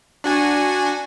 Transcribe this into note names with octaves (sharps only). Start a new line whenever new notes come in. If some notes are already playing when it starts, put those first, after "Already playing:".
D4 F#4 G#5